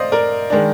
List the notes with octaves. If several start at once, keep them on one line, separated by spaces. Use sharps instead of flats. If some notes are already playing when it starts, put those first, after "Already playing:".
Already playing: C5 D5 D#5 F5
A#4 D5
D#3 G#3 D4